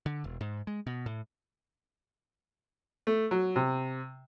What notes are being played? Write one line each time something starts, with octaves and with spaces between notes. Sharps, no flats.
D3
E1
G#2
G#3
B2
A2
A3
F#3
C3